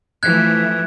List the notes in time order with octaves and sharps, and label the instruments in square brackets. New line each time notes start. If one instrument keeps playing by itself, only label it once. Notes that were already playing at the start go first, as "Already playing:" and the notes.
[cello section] E3 F3 A3 [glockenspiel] F#6 G#6